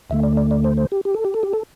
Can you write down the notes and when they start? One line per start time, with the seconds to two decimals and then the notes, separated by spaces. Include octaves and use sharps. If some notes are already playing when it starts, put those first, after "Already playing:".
0.10 D2 D3 A3 E5
0.23 D5
0.37 D5
0.51 D5
0.64 C5
0.77 C5
0.92 G4
1.05 G4
1.14 A4
1.25 G4
1.34 A4
1.43 G4
1.53 A4